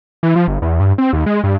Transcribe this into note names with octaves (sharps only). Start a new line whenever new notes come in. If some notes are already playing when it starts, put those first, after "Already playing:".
E3
F3
G1
E2
G2
C4
D#2
G#3
G2